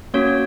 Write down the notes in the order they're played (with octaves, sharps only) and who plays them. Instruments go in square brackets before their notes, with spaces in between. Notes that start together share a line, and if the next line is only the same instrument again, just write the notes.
[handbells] A#3 C#4 F#4 C#5